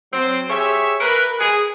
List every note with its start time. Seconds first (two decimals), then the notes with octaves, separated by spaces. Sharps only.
0.13 F#3 C4 C5
0.50 G4 G#4 C#5 E5
1.01 A#4 B4
1.39 G#4